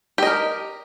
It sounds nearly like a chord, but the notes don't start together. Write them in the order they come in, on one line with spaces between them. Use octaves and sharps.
G4 D#5 A#4